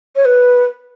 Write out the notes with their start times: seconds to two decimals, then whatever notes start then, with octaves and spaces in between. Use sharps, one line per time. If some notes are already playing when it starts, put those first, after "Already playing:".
0.16 C#5
0.25 B4